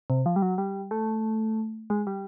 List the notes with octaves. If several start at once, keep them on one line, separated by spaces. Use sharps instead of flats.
C3
F3
G3
F#3
G3
A3
G#3
G3